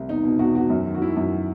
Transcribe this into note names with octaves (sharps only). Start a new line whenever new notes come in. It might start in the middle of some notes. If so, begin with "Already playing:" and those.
Already playing: C2
E2 D#4
B2
E2 F#4
E2 F#4
F#2
D#3
F#4
D#3 E4
F#2